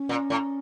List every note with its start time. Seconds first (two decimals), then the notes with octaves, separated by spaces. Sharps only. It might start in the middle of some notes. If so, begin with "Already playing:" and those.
Already playing: C#4
0.09 A#2
0.30 A2